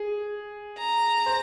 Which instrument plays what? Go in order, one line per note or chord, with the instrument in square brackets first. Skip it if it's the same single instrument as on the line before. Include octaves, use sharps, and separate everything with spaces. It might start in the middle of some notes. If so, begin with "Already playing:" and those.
Already playing: [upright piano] G#4
[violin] A#5
[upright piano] C5